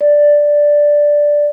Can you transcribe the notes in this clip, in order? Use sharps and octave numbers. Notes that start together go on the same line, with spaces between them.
D5